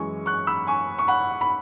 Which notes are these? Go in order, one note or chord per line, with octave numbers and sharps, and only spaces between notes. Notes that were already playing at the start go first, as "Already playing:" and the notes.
Already playing: F#2 E3 G#3 G#5 C#6
C#6 F#6
B5 E6
G#5 C#6
C#6
F#5 B5
B5